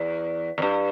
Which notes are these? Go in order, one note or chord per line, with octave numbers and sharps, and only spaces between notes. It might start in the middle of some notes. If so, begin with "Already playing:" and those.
Already playing: E2
E2
G2